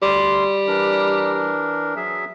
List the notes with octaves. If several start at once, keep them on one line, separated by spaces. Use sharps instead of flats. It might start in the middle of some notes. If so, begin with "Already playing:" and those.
D2 G3 C6
E3 D4 A#4
F#3 G#4 E5